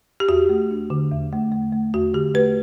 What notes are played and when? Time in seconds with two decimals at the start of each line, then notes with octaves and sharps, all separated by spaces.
0.20 G4
0.29 E2 F#4
0.49 A3
0.71 D4
0.90 D3
1.11 E2
1.33 A3
1.52 A3
1.73 A3
1.94 E2 F#4
2.14 D3 G4
2.34 A3 B4